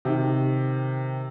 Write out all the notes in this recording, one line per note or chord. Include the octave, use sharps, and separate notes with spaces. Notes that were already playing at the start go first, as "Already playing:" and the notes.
C3 D#3